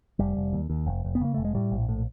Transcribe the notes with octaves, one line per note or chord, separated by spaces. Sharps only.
F1 G3
F1
D#2
D#2
F1
F1
B3
C#3 A#3
F1 A3
G#3
A2 G3
A#1
A2